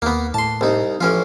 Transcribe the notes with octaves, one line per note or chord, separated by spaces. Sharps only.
D#2 A#3 B3
A2 A5 C6
C2 D#4
A1 F3 C#4 F4